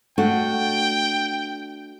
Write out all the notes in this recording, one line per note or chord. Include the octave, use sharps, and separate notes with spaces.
A3 D4 F#4 G5